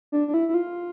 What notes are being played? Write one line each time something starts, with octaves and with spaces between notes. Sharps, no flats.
D4
D4
E4
E4
F4